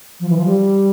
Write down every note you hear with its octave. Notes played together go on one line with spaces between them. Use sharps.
F3
E3
F3
G3